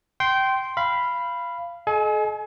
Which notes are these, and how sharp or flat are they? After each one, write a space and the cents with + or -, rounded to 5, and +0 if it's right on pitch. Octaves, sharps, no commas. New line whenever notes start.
G5 -20 C6 +0
F5 -20 B5 +0
A4 -45 D#5 -15 G#5 +25